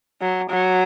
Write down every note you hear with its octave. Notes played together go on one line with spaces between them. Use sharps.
F#3
F#3